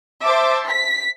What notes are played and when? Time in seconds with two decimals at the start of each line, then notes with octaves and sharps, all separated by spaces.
0.22 C5 E5 A5 D6
0.67 B6